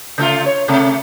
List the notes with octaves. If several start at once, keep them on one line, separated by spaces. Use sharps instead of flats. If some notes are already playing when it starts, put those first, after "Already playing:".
C#3 A3 F4
C#5
C3 A3